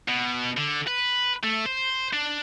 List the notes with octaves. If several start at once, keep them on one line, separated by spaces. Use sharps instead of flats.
B2
D3
B4
A3
C5
D4